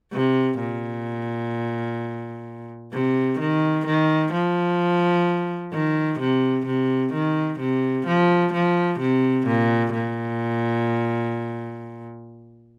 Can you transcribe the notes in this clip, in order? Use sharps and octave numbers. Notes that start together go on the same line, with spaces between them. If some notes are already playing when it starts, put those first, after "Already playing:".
C3
A#2
C3
D#3
D#3
F3
D#3
C3
C3
D#3
C3
F3
F3
C3
A#2
A#2